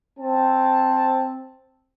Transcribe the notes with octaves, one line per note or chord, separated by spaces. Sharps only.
C4 A5